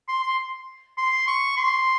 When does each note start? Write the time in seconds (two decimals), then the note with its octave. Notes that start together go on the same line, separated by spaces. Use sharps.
0.08 C6
0.23 C6
0.98 C6
1.27 C#6
1.57 C6